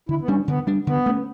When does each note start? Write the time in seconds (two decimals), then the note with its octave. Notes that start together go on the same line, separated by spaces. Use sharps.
0.09 D3 E4
0.21 B3
0.28 G3 C#4 D4
0.48 D3 B3
0.67 G3 D4
0.87 D3 B3
1.06 A3 C#4